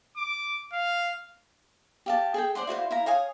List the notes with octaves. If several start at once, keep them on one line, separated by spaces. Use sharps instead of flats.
D6
F5
G4 F5 A5
G#4 A4 G5
C5 D5 F#5 C6
E4 F#4 C5 F5
E4 F5 A#5
C#5 F5 G#5 D#6